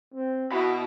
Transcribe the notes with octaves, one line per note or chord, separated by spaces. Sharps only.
C4
B2 E4 F#4 B5